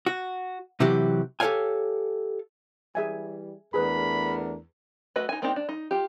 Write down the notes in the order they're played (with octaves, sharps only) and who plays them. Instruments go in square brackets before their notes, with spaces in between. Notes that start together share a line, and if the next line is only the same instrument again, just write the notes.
[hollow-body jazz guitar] F#4
C3 E3 F#3 F#4 G4
G4 A4 A#4 C#5 F5 G#5
[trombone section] E3 G3 [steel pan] G#4 E5 G#5
[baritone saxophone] E2 [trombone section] A3 D4 A#4 [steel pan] G#4 B4 [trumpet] B5
[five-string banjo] A3 F#4 B4 D#5
D#4 G#5
A#3 C4 D4 D#4 G4
D4
D#4
F4 G4